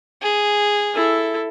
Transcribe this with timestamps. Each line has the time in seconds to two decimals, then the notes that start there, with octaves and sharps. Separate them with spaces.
0.22 G#4
0.95 E4 A4